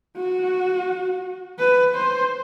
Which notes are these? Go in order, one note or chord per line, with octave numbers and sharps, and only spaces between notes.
F#4
B4
C5